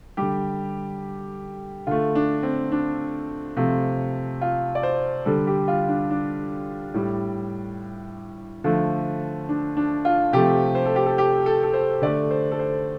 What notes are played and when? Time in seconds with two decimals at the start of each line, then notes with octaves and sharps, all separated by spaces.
0.17 D3 G3 G4
1.87 D3 A3 F4
2.15 D4
2.43 C4
2.72 D4
3.57 C3 F3 A3
4.41 F4
4.75 D5
4.83 C5
5.26 D3 G3 A4
5.47 G4
5.68 F4
5.89 D4
6.10 D4
6.94 A2 G3
8.64 D3 F3 A3
9.49 D4
9.77 D4
10.05 F4
10.33 C3 F3 A3 G4
10.75 C5
10.86 A4
10.96 G4
11.06 A4
11.18 G4
11.46 A4
11.63 A4
11.74 C5
12.02 D3 A3 D5
12.31 C5
12.52 A4
12.59 C5